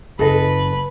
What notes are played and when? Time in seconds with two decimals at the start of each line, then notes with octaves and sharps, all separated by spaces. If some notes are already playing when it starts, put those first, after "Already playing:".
0.19 F#1 G#4 A4 B4 D#5